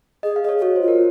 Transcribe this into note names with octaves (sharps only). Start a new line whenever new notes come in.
G#4 D#5
F5
G#4 D#5
C#5
G#4
F#4 C#5
C5
F4
A#4